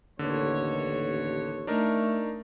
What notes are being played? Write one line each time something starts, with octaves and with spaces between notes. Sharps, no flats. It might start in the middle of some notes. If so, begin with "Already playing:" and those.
A1 D#2 D3 C#5
A3 D4 D#4 A#4